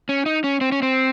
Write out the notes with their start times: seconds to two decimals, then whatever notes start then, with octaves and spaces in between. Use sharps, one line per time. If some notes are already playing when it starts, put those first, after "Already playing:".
0.09 C#4
0.26 D#4
0.44 C#4
0.61 C4
0.72 C#4
0.82 C4